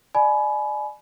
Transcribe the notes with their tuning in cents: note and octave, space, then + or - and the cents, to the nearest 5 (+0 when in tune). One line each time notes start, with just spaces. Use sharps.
D5 +35 G#5 +30 B5 +0